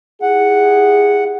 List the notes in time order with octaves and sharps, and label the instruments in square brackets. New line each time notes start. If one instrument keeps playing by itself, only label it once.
[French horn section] E4 G4 G#4 [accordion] F#5